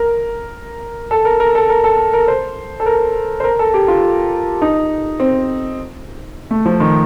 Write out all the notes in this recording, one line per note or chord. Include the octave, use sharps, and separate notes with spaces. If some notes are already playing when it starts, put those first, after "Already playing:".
Already playing: A#4
A4
A#4
A#4
A4
A#4
A4
A#4
C5
A4
A#4
C5
A#4
A4
G4
F4
D#4
C4
A3
F3
D#3